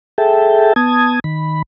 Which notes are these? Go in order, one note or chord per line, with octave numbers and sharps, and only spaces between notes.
G#4 A4 E5 G5 A5
B3 A5 D#6 G#6
D#3 B5